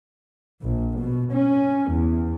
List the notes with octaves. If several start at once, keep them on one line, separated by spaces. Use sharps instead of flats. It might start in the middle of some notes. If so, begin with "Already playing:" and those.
A#1
B2
C#4
E2